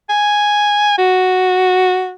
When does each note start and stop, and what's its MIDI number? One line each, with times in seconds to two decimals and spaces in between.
0.09 0.98 80
0.98 2.13 66